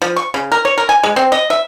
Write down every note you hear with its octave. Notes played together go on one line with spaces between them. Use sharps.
F3
C#6
C#3
A#4
C#5
A#4
G#5
G#3
C4
D#5
E5